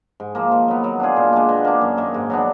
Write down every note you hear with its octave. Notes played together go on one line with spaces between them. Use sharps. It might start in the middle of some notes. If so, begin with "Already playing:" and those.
G#2
F3 A#3
D#3
F#3 B3
F#3
D4 F4 G#4
A#2
G#3 D4
B2
A#3 D4
F#2
D#3 A#3
G#2
F#3 B3 D4